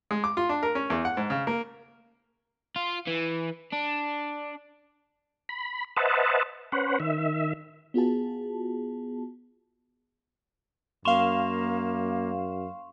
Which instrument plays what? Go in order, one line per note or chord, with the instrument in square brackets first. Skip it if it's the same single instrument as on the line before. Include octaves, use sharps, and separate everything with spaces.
[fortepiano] G#3
D6
F4
D4
A#4
C#4
E2
F#5
G#2
C#3
A#3
[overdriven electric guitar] F4
E3
D4
[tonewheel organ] B5
B4 C5 D#5 E5 F#5 A5
C#4 B4 C5 F#5
D#3 E5
[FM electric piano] B3 F4 F#4 G#4 A5
[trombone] F#2 [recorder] A#3 [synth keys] F5 E7 [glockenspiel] C6 C#6 F7